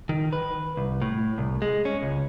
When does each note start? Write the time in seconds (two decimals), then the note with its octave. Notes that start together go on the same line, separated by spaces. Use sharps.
0.09 D#3
0.33 B4
0.77 C2
1.02 A2
1.38 C2
1.62 G#3
1.85 C#4
2.03 C#2